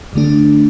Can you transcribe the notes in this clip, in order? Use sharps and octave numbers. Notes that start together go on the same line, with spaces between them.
D2 D3 A3 D4